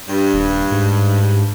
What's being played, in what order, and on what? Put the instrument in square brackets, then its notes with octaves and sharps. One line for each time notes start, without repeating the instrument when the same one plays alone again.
[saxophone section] G2
[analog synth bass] D#1
G#2